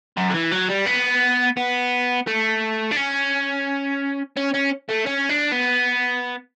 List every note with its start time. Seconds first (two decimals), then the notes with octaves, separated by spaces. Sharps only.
0.17 F#2
0.30 D3
0.35 E3
0.52 F#3
0.70 G3
0.86 B3
1.57 B3
2.27 A3
2.92 D4
2.97 C#4
4.37 C#4
4.54 C#4
4.89 A3
5.06 C#4
5.29 D4
5.52 B3